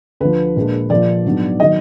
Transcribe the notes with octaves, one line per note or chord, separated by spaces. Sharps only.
D2 D3 F3 B4
A#1 A#2 G#3 D4
A#1 A#2 F3 D5
G#2 F#3 B3 D4
D#3 F#3 D#5